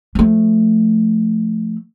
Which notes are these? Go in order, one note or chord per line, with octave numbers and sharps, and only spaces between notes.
F3 A3